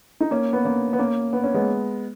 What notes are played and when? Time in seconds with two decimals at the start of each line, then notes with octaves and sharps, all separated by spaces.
0.20 D#4
0.31 A#3 C#4
0.53 B3
0.65 A#3 C#4
0.93 B3
0.99 A#3 C#4
1.33 B3
1.44 C#4
1.54 G#3 B3